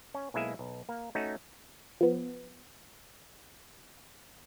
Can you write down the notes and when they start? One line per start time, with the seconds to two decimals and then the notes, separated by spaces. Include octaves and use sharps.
0.14 C#4
0.34 B1 G#3 A#3 E4 G#4 E5
0.59 B1
0.89 A#3
1.15 A3 C#4 D#4 F#4
2.01 F3 B3